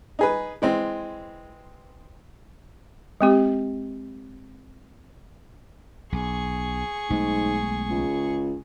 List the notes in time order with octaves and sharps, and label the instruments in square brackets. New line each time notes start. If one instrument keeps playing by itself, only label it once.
[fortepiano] D#4 G#4 B4
E3 G#3 C4
[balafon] G#3 C4 G4
[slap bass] B1 [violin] G#4 C#6
[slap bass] B1 G#3 A3 [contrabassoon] G#2
[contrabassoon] C#2